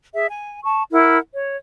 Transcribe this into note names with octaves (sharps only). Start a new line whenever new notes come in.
G#4 E5
G#5
A5 C#6
E4 A#4 F#5
C#5